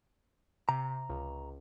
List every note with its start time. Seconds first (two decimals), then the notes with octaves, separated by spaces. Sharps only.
0.69 C3 A#5
1.09 C#2